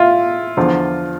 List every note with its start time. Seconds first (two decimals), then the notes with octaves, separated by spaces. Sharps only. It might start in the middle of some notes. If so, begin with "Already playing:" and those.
Already playing: A2 E4 F4
0.57 E2 D3 F3